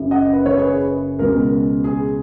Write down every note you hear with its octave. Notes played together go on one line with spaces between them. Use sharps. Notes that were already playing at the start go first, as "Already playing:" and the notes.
Already playing: F#1 F#2 C#3
D#5 F#5
B4
C#5
G#4 B4
C#2 B2 G#3 A#4
G#4